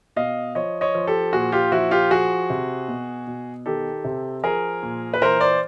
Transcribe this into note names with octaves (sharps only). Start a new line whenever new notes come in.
B2 D#5 F5
F3 C#5 D#5
C#5 D#5
F3
G4 A4
A#2 F#4 G#4
F4 G4
F3 E4 F#4
F4 G4
F3 F#4 G#4
C3
B2
B2
D#3 G4 A4
C3
F3 G#4 A#4
A#2
B4
E3 A#4 C5
C5 D5